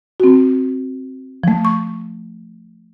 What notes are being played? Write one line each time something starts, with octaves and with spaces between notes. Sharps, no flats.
C4 F#4
F3 A3
C#6